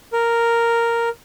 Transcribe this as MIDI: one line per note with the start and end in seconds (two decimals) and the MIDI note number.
0.13 1.09 70